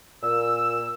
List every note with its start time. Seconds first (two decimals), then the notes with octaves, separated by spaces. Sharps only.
0.22 A#2 E6